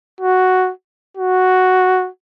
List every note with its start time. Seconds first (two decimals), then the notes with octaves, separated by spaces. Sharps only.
0.21 F#4
1.17 F#4